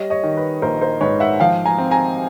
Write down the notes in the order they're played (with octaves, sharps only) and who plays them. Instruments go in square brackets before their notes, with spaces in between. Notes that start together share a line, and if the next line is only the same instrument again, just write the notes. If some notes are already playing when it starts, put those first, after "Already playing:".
Already playing: [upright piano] G3 C#5 D#5
C#5 D#5
D#3
B4
A#1 A#4 C5
A#4 C5
G#2 B4 C#5
E5 F#5
F3 F5 G5
G#5 A#5
C4
G#5 A#5